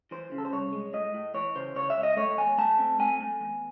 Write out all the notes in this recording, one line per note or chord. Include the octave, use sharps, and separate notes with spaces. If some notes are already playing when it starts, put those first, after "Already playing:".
E3 C5
C#3
A4
C5
C2 C#5
G#3
A2 D#5
A2
E3 C#5
C#3 C5
C#3 C#5
E5
C#2
D#5
A3 C#5
E2 G#5
A3 A5
C4
A3 G#5
A3
E2